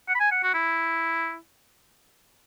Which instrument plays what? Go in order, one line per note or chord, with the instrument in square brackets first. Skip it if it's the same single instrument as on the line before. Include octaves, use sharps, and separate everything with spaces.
[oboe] F#5
B5
G#5
F#5
F#4
E4